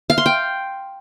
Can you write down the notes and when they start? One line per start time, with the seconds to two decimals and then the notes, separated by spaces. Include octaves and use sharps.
0.10 F5
0.18 C6
0.26 G5